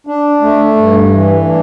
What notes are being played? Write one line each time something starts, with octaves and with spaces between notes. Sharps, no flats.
D4
A3
G2
E3
D4